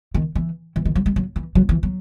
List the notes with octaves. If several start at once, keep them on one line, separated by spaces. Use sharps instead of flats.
D#3
E3
E3
D#3
F#3
G#3
F#3
E3
F#3
E3
F#3